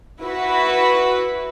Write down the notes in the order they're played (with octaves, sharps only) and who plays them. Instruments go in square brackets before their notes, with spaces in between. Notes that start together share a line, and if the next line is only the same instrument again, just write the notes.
[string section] E4 F#4 B4